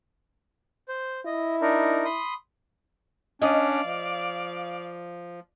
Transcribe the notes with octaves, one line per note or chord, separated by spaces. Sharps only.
C5
E4 D#5
D4 D#4 A#4
B5 C6 D#6
C#4 D4 D5 D#5 F5
F3